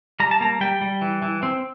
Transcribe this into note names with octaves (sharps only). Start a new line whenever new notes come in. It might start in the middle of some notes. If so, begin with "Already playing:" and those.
G3 A#5
A5
A#3 A#5
G3 G5
G3
E3
E3
C4